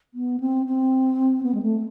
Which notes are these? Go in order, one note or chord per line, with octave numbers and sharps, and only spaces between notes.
B3
C4
C4
B3
G#3
A3